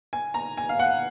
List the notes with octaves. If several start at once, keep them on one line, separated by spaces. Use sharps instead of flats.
G#5
A#5
G#5
F5
F#5